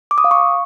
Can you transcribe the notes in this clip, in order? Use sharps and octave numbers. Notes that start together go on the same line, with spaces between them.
D6
D#6
F5
C#6